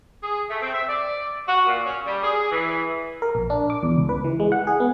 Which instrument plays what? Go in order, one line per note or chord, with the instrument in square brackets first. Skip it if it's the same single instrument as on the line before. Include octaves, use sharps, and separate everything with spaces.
[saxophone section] G#4
A3
C4
E5
D5
F#4
A#2
C#4
G3
G#4
E3
[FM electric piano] A#4
A#1
D4
D6
E2
C#2
B4
E3
G#3
F#5
G#4
B3